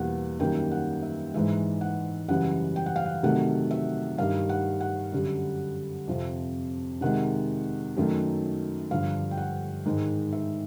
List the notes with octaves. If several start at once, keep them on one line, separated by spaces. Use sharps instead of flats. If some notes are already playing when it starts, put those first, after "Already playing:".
Already playing: E2 B2 G3 A#3 F#5
F#2 D#3 G3 A#3 G5
F#5
E5
G#2 E3 G#3 E5
F#5
F#2 C#3 E3 G3 F#5
G5
F#5
F5
F#5
C3 D#3 F#3 A3 F#5
E5
G2 D#3 G3 F5
F#5
F#5
F#2 D3 G3
F2 C3 F3
C3 D#3 G#3 F#5
F#2 D#3 F#3 A3
G2 D3 F3 F5
G5
F#5
G#2 D#3 G#3
E5